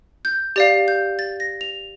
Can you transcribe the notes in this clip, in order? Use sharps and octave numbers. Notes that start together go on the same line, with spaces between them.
G6
G4 D5 F5 A6
G6
A6
A#6
F7